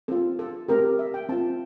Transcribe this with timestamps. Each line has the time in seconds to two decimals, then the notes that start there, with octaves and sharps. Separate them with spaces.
0.08 C4 F4 A4
0.39 A4
0.68 A3 C4 G4 A#4
0.84 A#4
0.99 E5
1.14 G5
1.29 C4 F4 A5